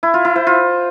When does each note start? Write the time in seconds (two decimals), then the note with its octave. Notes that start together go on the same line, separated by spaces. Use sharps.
0.03 E4
0.14 F4
0.25 E4
0.36 C5
0.47 F4